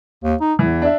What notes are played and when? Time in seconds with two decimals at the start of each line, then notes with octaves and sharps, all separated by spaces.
0.24 D#2
0.40 D#4
0.59 E2 E3
0.82 D4 E5